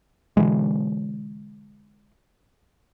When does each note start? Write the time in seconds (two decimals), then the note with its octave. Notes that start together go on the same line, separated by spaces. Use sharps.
0.37 B2 D3 E3 G#3